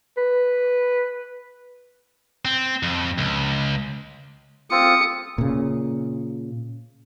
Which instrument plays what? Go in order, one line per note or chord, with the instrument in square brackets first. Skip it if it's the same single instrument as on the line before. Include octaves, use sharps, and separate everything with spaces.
[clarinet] B4
[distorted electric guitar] C4
F2
C#2
[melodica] C4 F4 [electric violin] D#6 C#7
[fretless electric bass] A#2 C#3